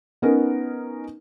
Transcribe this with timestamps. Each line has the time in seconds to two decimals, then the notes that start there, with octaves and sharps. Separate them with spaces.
0.22 B3 C#4 D#4 A#4